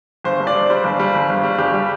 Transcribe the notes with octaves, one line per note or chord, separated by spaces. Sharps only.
G1 C5
G2
D5
G2
G3 C5
G1
G3
G1
G1
G3
G1 G4
G3